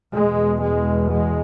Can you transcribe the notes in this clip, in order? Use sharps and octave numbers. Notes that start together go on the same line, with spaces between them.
E2 B2 G#3
G#3
G#3